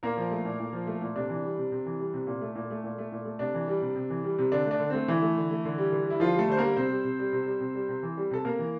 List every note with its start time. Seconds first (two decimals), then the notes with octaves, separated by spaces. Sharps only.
0.03 A#2 A#3 A#4
0.17 F3
0.31 A3
0.45 A#2
0.60 A#2
0.73 F3
0.87 A3
1.01 A#2
1.15 C3 D4
1.29 E3
1.43 G3
1.58 C3
1.72 C3
1.86 E3
2.00 G3
2.13 C3
2.27 A#2
2.41 A3
2.55 A#2
2.70 A3
2.84 A#2
2.98 A3
3.12 A#2
3.25 A3
3.39 C3 D4
3.54 E3
3.68 G3
3.82 C3
3.95 C3
4.10 E3
4.24 G3
4.38 C3
4.52 D3 D4
4.66 A3 D4
4.80 D3
4.90 A3 C4
5.08 D3 E3 E4
5.22 A3
5.36 D3
5.51 A3
5.65 D3
5.78 G3
5.92 D3
6.06 G3 E4
6.20 D3 F3 F4
6.34 G3 A3 A4
6.48 D3 C5
6.57 G3 A#3 A#4
6.76 C3 C4 C5
6.91 G3
7.04 C3
7.19 G3
7.33 C3
7.46 G3
7.61 C3
7.75 G3
7.89 C3
8.03 E3
8.17 G3
8.31 C3 A4
8.45 C3 A#3 A#4
8.59 E3